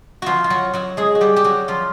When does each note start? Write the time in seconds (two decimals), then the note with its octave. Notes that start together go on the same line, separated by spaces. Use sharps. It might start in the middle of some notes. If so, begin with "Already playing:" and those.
0.22 F3 F4 F#4
0.44 F4
0.50 F#3 F#4
0.73 F#3 F#4
0.97 G#3 G#4
1.15 F#4
1.21 G3 G4
1.36 G4
1.44 F#3 F#4
1.68 F3 F4